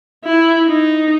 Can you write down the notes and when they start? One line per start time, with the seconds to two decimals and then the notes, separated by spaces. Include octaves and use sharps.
0.25 E4
0.68 D#4